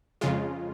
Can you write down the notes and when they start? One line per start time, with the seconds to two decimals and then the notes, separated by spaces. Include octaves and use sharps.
0.21 F2 C#3 G#3 F4